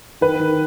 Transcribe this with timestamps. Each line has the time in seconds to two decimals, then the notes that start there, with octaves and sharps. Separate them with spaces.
0.21 D#3 B4
0.40 D#3